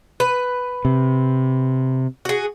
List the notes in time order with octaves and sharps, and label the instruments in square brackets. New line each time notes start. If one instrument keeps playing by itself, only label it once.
[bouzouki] B4
[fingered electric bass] C3
[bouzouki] F#4 G#4